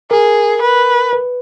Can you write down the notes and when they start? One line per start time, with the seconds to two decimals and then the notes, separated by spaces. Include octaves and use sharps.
0.11 G#4 A#4
0.62 B4
1.13 B4